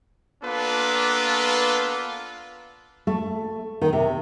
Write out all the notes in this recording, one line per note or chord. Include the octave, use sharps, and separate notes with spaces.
A#3 B3 D4 F4 A4 B4
A3
D#3
C3